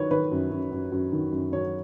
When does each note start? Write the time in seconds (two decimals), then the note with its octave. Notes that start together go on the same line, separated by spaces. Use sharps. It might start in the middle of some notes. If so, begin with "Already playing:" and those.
Already playing: D#3 F#3 B4 C#5
0.11 D#3 B4
0.32 F#2
0.52 F#2
0.72 F#2
0.92 F#2
1.12 D#3
1.32 F#2
1.52 F#3 C#5